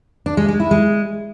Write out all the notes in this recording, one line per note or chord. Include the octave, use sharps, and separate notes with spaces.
D4
G#3
G#3
E4
G#3